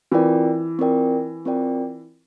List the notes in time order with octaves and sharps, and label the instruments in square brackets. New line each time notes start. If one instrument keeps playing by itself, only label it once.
[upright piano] E3 [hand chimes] C4 F4 A#4 D5 G5
[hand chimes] C4 F4 A#4 D5 G5
C4 F4 A#4 D5 G5